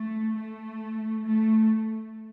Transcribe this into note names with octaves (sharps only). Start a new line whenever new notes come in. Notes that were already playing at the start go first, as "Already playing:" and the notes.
Already playing: A3
A3
A3